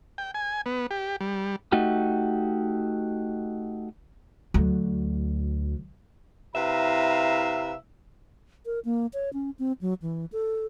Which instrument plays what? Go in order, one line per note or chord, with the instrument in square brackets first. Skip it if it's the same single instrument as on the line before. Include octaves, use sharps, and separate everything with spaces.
[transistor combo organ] G5
G#5
B3
G4
G3
[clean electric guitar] A3 D#4 F#4 G4
[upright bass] D2 F#3
[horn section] C3 E4 B4 E5 F5 A#5
[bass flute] A#4
A#3
C#5
C#4
C4
F#3
E3
A4